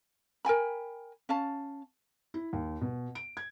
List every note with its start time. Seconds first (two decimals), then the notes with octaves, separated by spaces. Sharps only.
0.45 A#4 G5 G#5 B5
1.29 C#4 F5 A5
2.34 E4
2.53 D#2
2.81 B2
3.15 D7
3.37 G#6